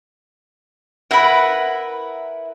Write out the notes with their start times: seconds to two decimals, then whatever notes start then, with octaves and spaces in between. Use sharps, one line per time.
1.11 E4 A#4 B4 F#5 B5